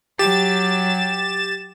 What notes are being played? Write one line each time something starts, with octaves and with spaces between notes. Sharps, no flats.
F#3 G4 A6 E7